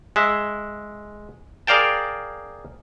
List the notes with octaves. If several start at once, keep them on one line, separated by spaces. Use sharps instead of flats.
G#3 E5
G#4 A#4 D5 F5 G5 A5